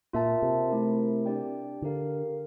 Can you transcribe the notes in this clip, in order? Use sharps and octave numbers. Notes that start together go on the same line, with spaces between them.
A#2 F4 A#4 E5 A5
C3
A3 E4 A#4
D4 G4 D5 G5
D3 G4 A#4 F5